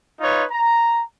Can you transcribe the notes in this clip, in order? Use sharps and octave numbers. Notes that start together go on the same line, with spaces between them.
D#4 F4 B4 C#5
A#5